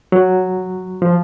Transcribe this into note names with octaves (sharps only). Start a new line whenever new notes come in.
F#3
F3